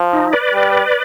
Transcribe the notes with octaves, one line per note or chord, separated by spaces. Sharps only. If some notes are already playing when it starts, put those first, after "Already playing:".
Already playing: F3
D#4
B4 D5
G3